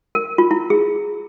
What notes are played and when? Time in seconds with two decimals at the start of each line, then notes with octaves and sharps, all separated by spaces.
0.15 A#4
0.38 F4
0.51 E4
0.70 G#4